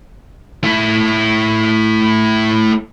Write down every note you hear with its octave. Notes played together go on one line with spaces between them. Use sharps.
A3 E4